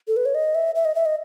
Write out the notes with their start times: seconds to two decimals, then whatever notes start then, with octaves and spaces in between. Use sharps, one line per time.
0.08 A4
0.16 B4
0.25 C#5
0.35 D#5
0.55 E5
0.75 E5
0.85 D#5
0.95 E5
1.06 D#5